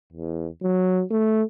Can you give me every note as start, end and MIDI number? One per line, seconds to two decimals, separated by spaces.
0.13 0.47 40
0.63 1.03 54
1.11 1.42 57